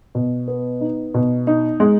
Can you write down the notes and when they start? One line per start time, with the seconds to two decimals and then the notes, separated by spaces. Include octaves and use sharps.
0.15 B2
0.48 B3
0.81 D#4
1.14 B2
1.47 D#4
1.80 G#3